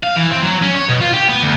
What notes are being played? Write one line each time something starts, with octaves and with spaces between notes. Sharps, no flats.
F5
E3
C4
F#3
C#4
C#5
B2
F4
G4
B3
D2